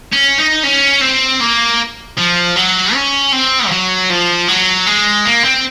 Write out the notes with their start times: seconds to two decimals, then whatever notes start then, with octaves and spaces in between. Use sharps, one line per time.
0.12 C#4
0.38 D#4
0.63 C#4
1.01 C4
1.41 A#3
2.17 F3
2.56 F#3
2.94 C#4
3.33 C4
3.67 F3
3.71 F#3
4.10 F3
4.48 F#3
4.86 G#3
5.25 A#3
5.44 C4